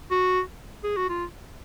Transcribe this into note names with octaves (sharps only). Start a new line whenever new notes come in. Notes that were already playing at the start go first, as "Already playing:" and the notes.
F#4
G#4
F#4
F4